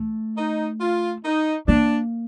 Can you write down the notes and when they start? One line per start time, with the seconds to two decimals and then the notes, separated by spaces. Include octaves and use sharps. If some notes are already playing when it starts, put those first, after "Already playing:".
Already playing: A3
0.37 D#4
0.81 F4
1.25 D#4
1.68 A#3 D4